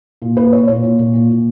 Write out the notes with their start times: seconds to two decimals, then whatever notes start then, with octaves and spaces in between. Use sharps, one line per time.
0.22 A#2
0.36 A#2 B4
0.53 A#2 C#5
0.67 A#2 C#5
0.83 A#2
0.99 A#2
1.13 A#2
1.29 A#2